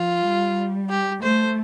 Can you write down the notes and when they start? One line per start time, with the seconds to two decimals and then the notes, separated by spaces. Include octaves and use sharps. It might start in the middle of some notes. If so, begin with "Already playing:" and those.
Already playing: F3 F4
0.25 G3
0.89 G4
1.22 A3 C5